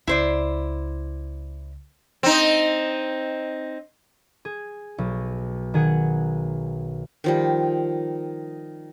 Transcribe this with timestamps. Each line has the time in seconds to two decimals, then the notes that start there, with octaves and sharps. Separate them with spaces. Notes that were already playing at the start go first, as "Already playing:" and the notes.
0.07 C#2 E4 C5 D5
2.23 C4 D#4
4.45 G#4
4.98 B1
5.74 D#3 G#4 F#5
7.24 D#3 F3 G3